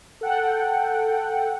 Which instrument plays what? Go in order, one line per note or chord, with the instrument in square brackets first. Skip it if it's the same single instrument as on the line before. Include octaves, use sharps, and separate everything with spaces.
[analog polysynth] A4 F#5 G5